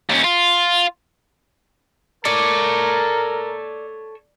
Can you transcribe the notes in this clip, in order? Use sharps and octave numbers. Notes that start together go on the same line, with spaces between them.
D#2 C#4
F4
A4 A#4 C#5 D5